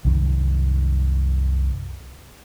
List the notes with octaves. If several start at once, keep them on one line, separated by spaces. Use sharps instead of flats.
C2 F#2 D#3